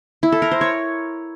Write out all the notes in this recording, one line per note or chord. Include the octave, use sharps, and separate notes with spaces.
E4
A4
A#4
C5
C#5